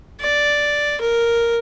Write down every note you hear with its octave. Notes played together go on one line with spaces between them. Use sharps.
D5
A#4